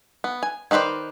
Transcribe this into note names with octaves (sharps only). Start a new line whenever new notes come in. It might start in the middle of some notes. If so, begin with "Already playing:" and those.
B3
G#5
D#3 D#4 B4 C5 D5